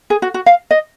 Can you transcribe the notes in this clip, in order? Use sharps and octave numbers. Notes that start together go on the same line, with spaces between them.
G#4
F#4
F#4
F5
D#5